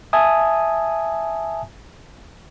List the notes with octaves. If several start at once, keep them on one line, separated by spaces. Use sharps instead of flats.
E5 G#5 A5 D#6